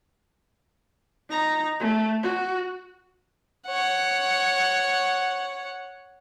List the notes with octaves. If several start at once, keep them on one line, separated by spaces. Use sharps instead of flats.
D#4 A#5
A3
F#4
C#5 F#5